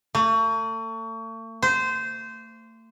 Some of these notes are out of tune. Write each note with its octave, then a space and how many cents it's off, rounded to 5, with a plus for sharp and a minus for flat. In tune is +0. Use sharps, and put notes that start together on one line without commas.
A3 +40
C5 -20